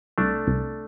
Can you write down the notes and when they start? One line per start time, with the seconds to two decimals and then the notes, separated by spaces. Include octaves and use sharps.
0.18 C2 A3 D4
0.47 C2